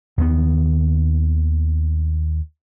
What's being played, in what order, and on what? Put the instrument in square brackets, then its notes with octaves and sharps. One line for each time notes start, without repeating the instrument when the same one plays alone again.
[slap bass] D#2 D#3 F#3 B3